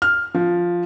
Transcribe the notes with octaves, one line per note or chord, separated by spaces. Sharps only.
F6
F3